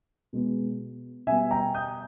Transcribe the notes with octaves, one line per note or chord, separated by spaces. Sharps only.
B2 G#3 B3
B2 G3 B3 E5 G#5
G5 A#5
D#6 G6